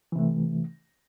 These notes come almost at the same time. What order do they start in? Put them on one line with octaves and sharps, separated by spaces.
E3 C3 A3